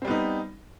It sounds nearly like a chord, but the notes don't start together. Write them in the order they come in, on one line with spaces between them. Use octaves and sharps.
C4 G3 B3 D#4